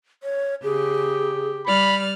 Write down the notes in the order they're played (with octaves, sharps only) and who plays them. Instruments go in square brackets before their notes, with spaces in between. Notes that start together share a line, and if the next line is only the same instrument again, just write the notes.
[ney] C#5
[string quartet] C#3 [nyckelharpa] G4 [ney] G#4
[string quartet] G3 D5 F6 [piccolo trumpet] B5